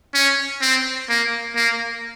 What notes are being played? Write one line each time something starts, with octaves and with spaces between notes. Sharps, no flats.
C#4
C4
A#3
A#3